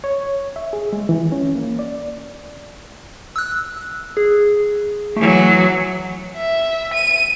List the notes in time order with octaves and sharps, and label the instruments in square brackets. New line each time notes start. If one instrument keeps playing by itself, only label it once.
[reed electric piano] C#5
E5
G#4
G#3
E3
C#4
A#3
D5
[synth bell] E6 F#6
G#4
[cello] E3 F#3 [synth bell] A3
[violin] E5
D#7